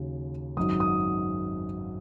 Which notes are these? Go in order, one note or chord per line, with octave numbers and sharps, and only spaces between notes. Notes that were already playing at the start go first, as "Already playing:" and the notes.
Already playing: D#2 C#3 F#3
G#1 F#2 D#3 F#3 D#6
D#6